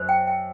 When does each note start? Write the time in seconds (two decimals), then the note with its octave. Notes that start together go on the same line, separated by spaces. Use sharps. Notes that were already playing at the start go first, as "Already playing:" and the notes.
Already playing: F#2 C5
0.09 G5
0.27 G5